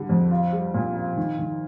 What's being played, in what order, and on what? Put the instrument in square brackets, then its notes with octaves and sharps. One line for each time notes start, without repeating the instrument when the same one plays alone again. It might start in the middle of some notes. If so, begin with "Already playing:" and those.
Already playing: [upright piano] D3 G3
F2
F4
G3
A#2
F4
D#3
D#3